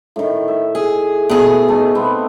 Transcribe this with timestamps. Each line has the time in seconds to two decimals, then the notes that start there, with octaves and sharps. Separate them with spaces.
0.16 A2 D#3
0.48 E5
0.75 G#4
1.29 B2 A3 G#4
1.68 A3 D#4
1.95 B3 C4